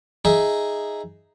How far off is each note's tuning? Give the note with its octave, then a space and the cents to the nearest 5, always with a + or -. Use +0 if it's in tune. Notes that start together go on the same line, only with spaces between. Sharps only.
D#4 +0 G#4 +0 E5 +0